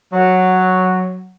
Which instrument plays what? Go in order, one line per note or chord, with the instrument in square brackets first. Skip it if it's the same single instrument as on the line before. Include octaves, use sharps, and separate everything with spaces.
[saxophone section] F#3